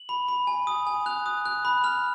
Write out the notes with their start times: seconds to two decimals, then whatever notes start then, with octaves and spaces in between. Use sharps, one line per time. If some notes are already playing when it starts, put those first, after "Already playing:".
Already playing: F#7
0.09 B5
0.28 B5
0.47 G#5
0.67 D#6
0.87 G#5
1.06 F#6 F7
1.26 D#6
1.46 F#6
1.65 B5
1.84 F6 F7